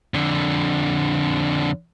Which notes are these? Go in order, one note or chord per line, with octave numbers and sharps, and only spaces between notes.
F2 D3